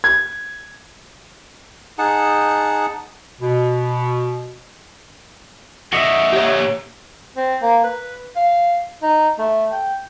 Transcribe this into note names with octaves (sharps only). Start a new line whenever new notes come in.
G#6
D#4 G#4 F#5 A5
B2
A#2 D3 F#4 D#5 E5
G4 C#5
C4
A#3
B4
F5
D#4
A3
G5